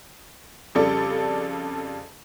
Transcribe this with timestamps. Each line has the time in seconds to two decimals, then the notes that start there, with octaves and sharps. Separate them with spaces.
0.75 F2 C#3 G3 A4 D5